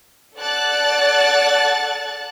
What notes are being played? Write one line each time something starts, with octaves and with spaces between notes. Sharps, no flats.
A4 D5 F#5 A5 F#6 A6